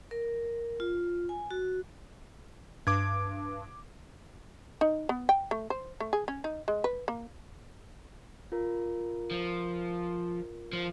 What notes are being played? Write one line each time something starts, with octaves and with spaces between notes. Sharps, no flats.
A#4
F4
G#5
F#4
G2 D6 G#6
D#4
B3
G5
A3
C5
A3
G#4
C#4
D#4
G#3
B4
A#3
F4 A#4
F3
F3